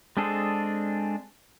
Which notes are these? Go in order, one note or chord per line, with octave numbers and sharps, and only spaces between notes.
G#3 C4 D4 G#4 A4